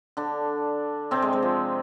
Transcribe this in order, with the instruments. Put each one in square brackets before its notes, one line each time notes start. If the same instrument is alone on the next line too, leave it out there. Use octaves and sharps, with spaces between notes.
[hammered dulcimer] D3 D4
C3 C4
G#3
G#3
F3